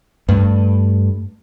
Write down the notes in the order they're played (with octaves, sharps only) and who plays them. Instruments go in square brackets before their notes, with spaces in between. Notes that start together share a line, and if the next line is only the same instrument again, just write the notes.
[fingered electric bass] G2 A3